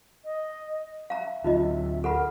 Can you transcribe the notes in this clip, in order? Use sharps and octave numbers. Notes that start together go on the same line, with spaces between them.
D#5
E5 F5 A#5
D2 F#3 D4 D#4 F4 D#5
A4 A#4 F#5 B5